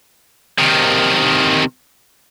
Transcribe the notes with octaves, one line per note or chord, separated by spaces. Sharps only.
C3 D#3